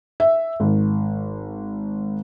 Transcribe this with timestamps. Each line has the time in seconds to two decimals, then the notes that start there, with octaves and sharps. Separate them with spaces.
0.20 E5
0.60 G#1